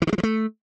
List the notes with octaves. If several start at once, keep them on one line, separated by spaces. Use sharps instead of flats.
E3
D#3
G#3
F3
A3